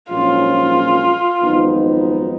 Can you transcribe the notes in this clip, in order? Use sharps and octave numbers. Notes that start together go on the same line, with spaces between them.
A#1 G#2 F#3 A#3 C#4 F4
G#1 F#2 F3 B3 D#4